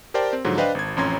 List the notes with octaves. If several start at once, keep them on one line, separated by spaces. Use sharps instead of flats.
G4 A#4 C5 D5 G5 A5
C4
G#2 D3 F3 F#3
D4 B4 C5 D#5 F5 G5
G#1 G#6
A1 F2 C#4 A#5 C6 G#6